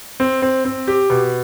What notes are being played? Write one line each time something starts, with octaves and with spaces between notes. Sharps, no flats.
C4
C4
C4
G4
B2